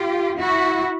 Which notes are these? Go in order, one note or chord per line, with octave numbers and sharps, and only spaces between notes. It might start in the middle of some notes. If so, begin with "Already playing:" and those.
Already playing: F4 G4
E4 F#4